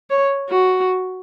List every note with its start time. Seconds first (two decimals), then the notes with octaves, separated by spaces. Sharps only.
0.10 C#5
0.49 F#4